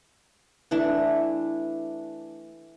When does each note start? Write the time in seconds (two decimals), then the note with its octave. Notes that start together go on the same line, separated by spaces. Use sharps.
0.71 E3 A3 D4